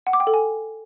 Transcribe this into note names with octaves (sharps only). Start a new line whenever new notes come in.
F#5
D6
G5
A4
G#5